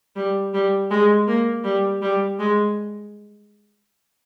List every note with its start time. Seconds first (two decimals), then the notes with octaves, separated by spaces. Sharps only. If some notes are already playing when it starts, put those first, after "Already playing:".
0.16 G3
0.54 G3
0.91 G#3
1.27 A#3
1.64 G3
2.02 G3
2.39 G#3